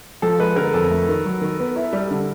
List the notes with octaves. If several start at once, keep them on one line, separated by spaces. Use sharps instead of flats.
F3 A4
G#3 B4
D3 A#4
F2 A4
A3
D#3
F#3
D#3
B3
E4
G3
D3